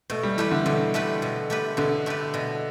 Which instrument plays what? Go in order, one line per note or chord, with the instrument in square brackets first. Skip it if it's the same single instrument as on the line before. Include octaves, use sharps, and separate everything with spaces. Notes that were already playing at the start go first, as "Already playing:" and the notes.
[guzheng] B2 [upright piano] A3
[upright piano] G3
[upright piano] E3 [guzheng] A3 G4 B4
[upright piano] D3
[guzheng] B2 [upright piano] D3
[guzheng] A3 G4 B4
B2
A3 G4 B4
[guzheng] B2 [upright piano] D3
[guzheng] A3 G4 B4
B2